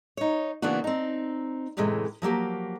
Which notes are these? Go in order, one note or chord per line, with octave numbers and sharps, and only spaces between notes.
D#4 C#5
C#3 E3 A#3 B3 D4 F#4
C4 D#4
F#2 A2 C3 E3 G#3 A3
F3 F#3 A#3 G4